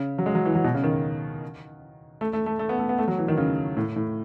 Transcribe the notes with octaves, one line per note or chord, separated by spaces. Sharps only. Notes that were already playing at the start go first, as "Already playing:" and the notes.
Already playing: C#3
F#3
G#3
F#3
E3
F#3
B2
C#3
D#3
A3
A3
A3
A3
B3
A3
B3
A3
F#3
E3
D#3
C#3
A2
A2